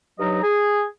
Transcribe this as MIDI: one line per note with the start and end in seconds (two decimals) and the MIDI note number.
0.19 0.42 43
0.19 0.42 54
0.19 0.42 63
0.19 0.42 75
0.19 0.42 82
0.43 0.83 68